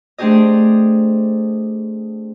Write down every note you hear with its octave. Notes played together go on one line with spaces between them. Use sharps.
A3 C4 D4 G4 G#4 D#5